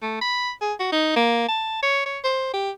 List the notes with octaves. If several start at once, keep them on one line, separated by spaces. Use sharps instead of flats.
A3
B5
G#4
F#4
D#4
A#3
A5
C#5
C#5
C5
G4